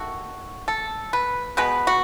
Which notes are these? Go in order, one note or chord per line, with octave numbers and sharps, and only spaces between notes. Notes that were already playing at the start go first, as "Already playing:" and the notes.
Already playing: D#3 A3 F#4
A4
B4
B2 G#3 B3 B4
F#4